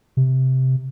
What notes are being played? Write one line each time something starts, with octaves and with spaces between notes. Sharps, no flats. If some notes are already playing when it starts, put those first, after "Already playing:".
C3